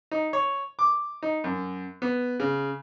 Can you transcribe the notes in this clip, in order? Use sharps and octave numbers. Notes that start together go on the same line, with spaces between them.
D#4
C#5
D6
D#4
F#2
B3
C#3